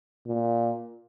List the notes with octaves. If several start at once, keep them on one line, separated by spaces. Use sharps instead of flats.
A#2